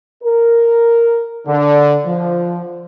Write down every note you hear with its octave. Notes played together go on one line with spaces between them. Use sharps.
A#4
D3
F3